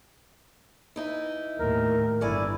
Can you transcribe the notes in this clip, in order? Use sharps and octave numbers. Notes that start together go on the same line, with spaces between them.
E3 D#4 E4
D#2 A2 A#4
G1 A3 E4 D5 G#5